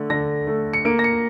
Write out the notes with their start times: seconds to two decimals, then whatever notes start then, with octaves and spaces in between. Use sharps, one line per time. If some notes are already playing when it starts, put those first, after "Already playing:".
Already playing: D3 A3
0.10 D3 A#6
0.47 A3
0.74 C#7
0.85 A#3 D7
0.99 A#6
1.04 C#7